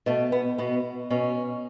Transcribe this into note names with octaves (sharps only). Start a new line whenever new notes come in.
B2 A3
B3
B2 B3
B2 C#4